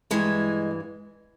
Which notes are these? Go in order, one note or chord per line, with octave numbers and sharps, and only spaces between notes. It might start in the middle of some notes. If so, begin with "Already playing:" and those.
G2 E3 G#3